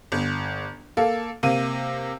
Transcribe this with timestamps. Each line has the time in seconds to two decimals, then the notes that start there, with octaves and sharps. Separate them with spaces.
0.12 G1
0.97 A#3 A4
1.43 C3 A#3 D#7